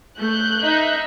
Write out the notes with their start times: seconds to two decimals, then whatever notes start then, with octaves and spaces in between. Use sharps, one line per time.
0.19 A3 F#6 G6
0.62 D#4 E5